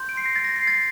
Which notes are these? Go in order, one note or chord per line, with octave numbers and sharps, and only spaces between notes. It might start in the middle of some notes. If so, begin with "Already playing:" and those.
Already playing: C6 G6
D7
C7
A#6
A6
A#6
C7
A6